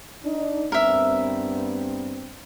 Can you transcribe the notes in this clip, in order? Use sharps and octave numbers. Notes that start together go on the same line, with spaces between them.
D4 D#4
G2 B3 C4 A#4 E5